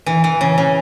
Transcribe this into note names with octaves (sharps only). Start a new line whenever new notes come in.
E3
E3
C#3
C#3